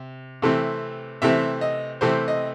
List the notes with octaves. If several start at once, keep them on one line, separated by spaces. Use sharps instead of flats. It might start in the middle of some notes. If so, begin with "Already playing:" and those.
Already playing: C3
C3 E3 A3 C4
C3 E3 A3 C4 E5
D#5
C3 E3 A3 C4 C5
D#5